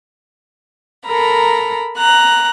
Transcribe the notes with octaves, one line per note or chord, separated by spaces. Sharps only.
A4 A#4 A#5 B5
A#5 F#6